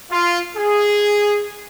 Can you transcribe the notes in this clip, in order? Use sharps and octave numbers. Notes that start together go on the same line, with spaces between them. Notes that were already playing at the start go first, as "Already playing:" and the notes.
F4
G#4